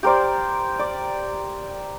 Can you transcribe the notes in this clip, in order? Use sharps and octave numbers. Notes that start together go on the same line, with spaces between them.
G4 A#4 C5 D5
D5